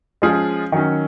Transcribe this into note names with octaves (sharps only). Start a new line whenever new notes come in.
F3 G#3 C#4 F4 G#4
D#3 F#3 C#4